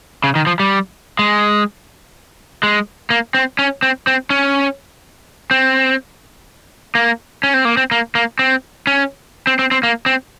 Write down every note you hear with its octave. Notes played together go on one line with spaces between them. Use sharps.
C#3
D#3
F3
G3
G#3
G#3
A#3
C4
C#4
C4
C4
C#4
C4
A#3
C#4
C4
A#3
C4
A#3
A#3
C4
C#4
C4
C4
C4
A#3
C4